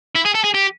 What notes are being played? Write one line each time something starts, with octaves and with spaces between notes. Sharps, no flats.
E4
G#4
A4
G#4
G4